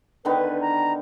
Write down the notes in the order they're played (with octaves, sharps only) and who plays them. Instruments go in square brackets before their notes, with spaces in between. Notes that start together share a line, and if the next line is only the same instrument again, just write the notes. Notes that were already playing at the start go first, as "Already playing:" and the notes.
[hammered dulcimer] D3 D#3 B3 [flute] B4
[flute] A#5